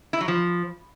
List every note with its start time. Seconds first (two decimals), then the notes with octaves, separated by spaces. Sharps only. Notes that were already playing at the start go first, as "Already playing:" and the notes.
0.13 E4
0.21 F#3
0.28 F3